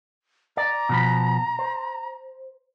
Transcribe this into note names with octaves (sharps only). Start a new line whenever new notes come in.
D5 A#5
B2 F3 B5
C5